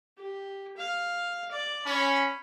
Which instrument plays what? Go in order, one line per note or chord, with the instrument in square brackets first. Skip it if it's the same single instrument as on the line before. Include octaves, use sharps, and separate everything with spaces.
[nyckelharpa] G4
F5
D5 D6
[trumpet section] C#4 [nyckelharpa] B5